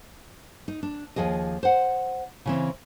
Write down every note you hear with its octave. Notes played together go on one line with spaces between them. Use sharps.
D#4
D4
D#2 A#2 F3 G#4 D#5
C5 F#5
C#3 E3 C4